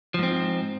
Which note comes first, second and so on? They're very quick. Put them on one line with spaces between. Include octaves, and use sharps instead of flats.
F3 G#2 C4